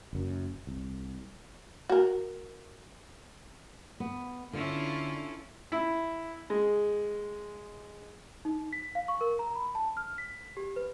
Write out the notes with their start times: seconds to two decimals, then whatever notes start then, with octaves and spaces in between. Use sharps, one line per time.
0.13 F#1 F#2
0.67 C2
1.90 F#4 A#4
4.00 B3
4.53 D3 C#4 E4 F4
5.72 E4
6.50 G#3
8.45 D#4
8.73 B6
8.95 F5
9.08 C#6
9.21 A#4
9.39 A#5
9.56 B5
9.75 A5
9.97 F6
10.18 B6
10.57 G4
10.76 B4